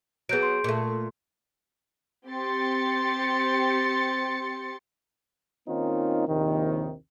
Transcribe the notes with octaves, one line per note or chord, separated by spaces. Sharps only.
F#3 B3 G#4 G6 D7
C6
A#2 A3
C4 G4 C6 A6 C#7
D#3 A#3 C4 C#4 D#4 F4
A#1 D#2 C3 D#3